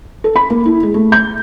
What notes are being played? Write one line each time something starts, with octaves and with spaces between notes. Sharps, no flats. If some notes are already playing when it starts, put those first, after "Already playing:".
A4
B5
A#3
E4
G#3
A3
G6